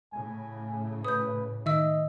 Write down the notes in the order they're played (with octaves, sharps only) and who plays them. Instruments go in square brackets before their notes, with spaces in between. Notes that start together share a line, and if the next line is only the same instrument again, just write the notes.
[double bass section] A2 C#3 [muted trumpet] G#5
[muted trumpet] B4 [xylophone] D#6 G6
[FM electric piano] D#3 [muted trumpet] D#5 [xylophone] E5 E6